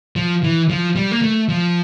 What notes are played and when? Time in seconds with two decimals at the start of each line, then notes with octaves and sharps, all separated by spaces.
0.16 F3
0.44 E3
0.70 F3
0.96 G3
1.12 A#3
1.22 A3
1.49 F3